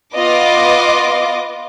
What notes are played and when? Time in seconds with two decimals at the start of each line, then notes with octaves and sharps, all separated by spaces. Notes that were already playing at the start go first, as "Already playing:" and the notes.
0.15 B3 F4 D#5 D6